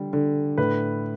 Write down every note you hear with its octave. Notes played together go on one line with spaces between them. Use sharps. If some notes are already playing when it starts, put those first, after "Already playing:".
Already playing: D3 G3
D3
A2 B4